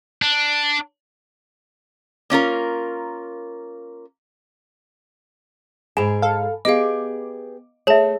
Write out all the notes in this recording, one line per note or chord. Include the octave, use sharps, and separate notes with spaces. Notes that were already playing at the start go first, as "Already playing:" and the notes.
D4
A#3 C#4 F4 A#4
G#2 G#4 G#5 B5 E7
A4 F5
B3 G4 G#4 D#5 F5 D6
A3 G#4 C#5 E5 A5